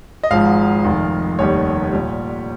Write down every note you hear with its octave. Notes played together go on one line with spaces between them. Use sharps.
D#5
G#1 G#2 F3 F5
F1 F2 D#3
F1 D#2 D#3 G3 C#5
C2 A#2 G3